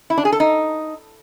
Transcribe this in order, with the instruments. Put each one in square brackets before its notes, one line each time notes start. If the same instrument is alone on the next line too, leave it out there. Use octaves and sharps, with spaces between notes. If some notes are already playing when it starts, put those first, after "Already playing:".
[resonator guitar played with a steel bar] E4
D4
G#4
A4
D#4